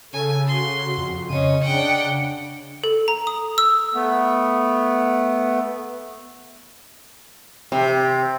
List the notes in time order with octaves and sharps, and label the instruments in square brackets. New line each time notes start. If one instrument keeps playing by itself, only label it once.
[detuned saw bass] C#3 [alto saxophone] A4 [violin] G#5
[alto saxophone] F#4 [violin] C6
[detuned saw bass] F2
[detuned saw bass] C#3 [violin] C#4 D#7 [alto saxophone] D#5
[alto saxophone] D4 [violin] F#5 G5
[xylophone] A4
A#5
D#6
E6
[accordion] A3 B3
[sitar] C3